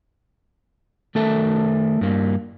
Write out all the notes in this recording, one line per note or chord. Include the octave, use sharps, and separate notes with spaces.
D#3 A3 A4 A#4 E5
G2 A#3